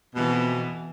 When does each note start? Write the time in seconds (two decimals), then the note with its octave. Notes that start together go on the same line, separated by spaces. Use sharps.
0.15 F2 B2 E3 B3